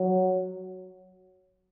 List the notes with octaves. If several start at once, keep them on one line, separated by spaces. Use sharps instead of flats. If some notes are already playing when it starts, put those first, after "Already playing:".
Already playing: F#3